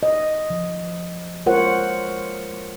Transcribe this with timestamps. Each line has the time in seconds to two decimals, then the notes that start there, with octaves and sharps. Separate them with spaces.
0.03 D#5
0.50 F3
1.46 G#3 F4 A#4 C5 C#5 F#5